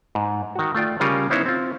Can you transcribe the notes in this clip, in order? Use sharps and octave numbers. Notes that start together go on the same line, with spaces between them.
G#2
D#3 F#4
A3 F4 D5 G5
C#3 G3 F4 G#4 A#4 C#5
B3 C#4 D#4 E4 C5 C#5
C4 F4